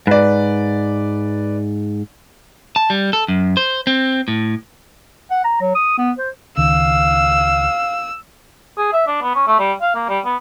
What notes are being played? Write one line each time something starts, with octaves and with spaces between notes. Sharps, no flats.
G#2 B4 D5
A5
G3
A4
F#2
C5
C4
A2
F#5
A#5
F#3
D#6
B3
C5
C#2 D#3 F5 E6
G#4
E5
D4
B3
C#4
A3
G3
F5
A#3
G3
B3